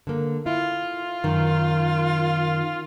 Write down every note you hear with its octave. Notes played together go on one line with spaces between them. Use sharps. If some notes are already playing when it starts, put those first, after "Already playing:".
D3 A#3
E4 F4
F#2 D#3